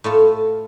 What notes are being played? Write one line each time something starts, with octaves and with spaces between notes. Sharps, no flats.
A2 A3 F4